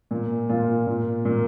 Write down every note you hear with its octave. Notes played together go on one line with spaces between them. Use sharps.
A#2
A#2 F4
A#2
A#2